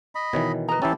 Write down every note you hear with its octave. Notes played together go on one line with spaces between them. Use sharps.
D#5 B5
B2 D#3 E3 C#5
B4 D#5 A#5
E3 C#4 E4 G4 A5